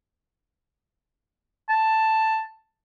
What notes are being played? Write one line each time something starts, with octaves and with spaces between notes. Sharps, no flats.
A5